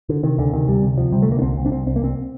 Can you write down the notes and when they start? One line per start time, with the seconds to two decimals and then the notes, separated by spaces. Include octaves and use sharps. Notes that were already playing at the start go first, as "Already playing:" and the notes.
0.09 D3
0.23 C3 D#3
0.38 D2 D3
0.53 C3 D#3
0.68 D2 G3
0.83 C3
0.98 D2 F3
1.12 C3 G3
1.22 A3
1.27 D2 A#3
1.39 D4
1.42 C2 C4
1.57 C2
1.66 D4
1.71 C2 C4
1.87 C2 C4
1.96 A#3
2.02 C2 C4